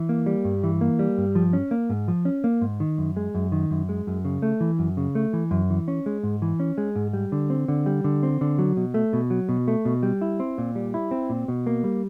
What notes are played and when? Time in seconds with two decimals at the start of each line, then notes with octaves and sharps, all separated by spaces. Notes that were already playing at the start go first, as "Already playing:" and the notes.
Already playing: E3
0.09 A#3
0.26 G3
0.45 G2
0.64 E3
0.81 A#3
0.99 G3
1.18 G2
1.35 F3
1.53 C#4
1.71 A#3
1.90 G#2
2.08 F3
2.25 C#4
2.44 A#3
2.61 G#2
2.80 D#3
2.98 F#2
3.17 G#3
3.35 F#2
3.52 D#3
3.71 F#2
3.89 G#3
4.07 F#2
4.25 C#3
4.42 A3
4.61 E3
4.79 F#2
4.97 C#3
5.15 A3
5.33 E3
5.51 F#2
5.70 E3
5.88 C#4
6.06 G#3
6.23 G#2
6.42 E3
6.60 C#4
6.78 G#3
6.96 G#2
7.13 G3
7.32 D3
7.50 C4
7.68 D3
7.86 G3
8.04 D3
8.23 C4
8.41 D3
8.58 F#3
8.77 B2
8.94 A3
9.13 B2
9.30 F#3
9.49 B2
9.68 A3
9.85 B2
10.03 G3
10.21 E4
10.40 C4
10.58 A#2
10.76 G3
10.94 E4
11.11 C4
11.30 A#2
11.48 B2
11.67 A#3
11.84 G3